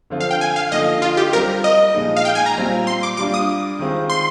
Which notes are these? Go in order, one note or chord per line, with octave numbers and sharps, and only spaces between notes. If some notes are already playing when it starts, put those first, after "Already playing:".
D3 F3 C4 F4
F5
G5
G#5
F5
D3 F3 A#3 D#4 D#5
F4
G4
G3 C4 F4 A#4
D#5
A#2 F3 G#3 D#4
F5
G5
G#5
A#5
A#2 G3 C4 F4
C6
D6
G3 A#3 D4 F4 D6
D#6
D#3 G#3 C4 F4
C6